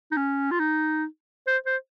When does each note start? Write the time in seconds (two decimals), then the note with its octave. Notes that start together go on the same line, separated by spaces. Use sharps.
0.11 D#4
0.17 C#4
0.51 F4
0.59 D#4
1.47 C5
1.66 C5